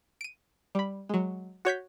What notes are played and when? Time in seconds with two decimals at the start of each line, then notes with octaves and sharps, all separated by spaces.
0.21 D7 D#7
0.75 G3 B5
1.09 F#3 G#3
1.65 F#4 C#5 G6 B6